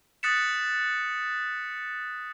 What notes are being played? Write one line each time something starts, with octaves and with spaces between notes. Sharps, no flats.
D#6 F#6 A6 B6 C#7 E7